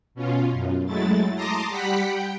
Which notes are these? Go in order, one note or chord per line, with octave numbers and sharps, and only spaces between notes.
B2 C#4 F4
F#2
F#3 G#3 A3 E4 A6
A5 A#5 C6 D6 D#6 A#6
G3 G4 F#5 B5 B6 C#7
G5